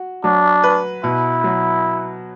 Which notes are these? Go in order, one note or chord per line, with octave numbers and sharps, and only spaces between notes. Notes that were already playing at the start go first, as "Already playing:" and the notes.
Already playing: F#4
F#3 D4
B4
B2 E4
F#3